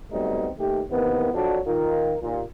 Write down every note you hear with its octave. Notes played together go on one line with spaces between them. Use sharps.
F#3 G3 A3 B3 C4 D#4
D#2 D#3 A3 G4
C3 D#3 E3 A#3 B3
F2 F#3 D4
D#3 F4 A#4
D#2 A#2